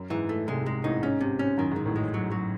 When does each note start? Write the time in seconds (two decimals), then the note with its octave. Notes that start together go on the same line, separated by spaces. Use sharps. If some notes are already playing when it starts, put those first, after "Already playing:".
Already playing: F#2
0.10 G#2 E3
0.29 A3
0.47 C2 C3 G#3
0.66 G#3
0.84 A1 A2 D#4
1.02 G#2 C#4
1.21 C3
1.39 C#4
1.58 F#2 D#3
1.71 G#2 D#3
1.85 A1 A2
1.96 G#3
2.14 F#3
2.31 F#3